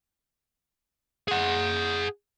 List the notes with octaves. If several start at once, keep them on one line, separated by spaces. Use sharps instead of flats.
G#4 F#5